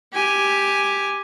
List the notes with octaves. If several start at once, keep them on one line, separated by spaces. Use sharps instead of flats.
G4 G#5